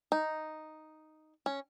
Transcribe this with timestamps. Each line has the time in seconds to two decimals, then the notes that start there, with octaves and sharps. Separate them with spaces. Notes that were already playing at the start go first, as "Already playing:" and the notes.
0.12 D#4
1.46 C#4